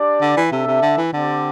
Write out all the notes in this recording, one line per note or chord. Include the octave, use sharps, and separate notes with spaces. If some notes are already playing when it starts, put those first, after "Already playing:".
Already playing: D4 G4 D5
D3
E3
C3 D4 A4 E5
C3
D3
E3
D3 C4 G4 D5